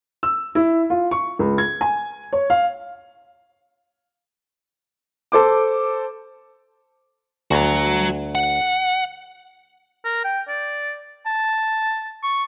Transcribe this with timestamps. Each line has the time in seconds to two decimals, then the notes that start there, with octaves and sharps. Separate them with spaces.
0.23 E6
0.55 E4
0.90 F4
1.11 C#6
1.39 C#2
1.58 G#6
1.81 G#5
2.33 C#5
2.50 F5
5.32 A4 C5 D6
7.51 D2 F#4 A#5
8.35 F#5
10.05 A#4
10.24 G5
10.48 D5
11.26 A5
12.23 C#6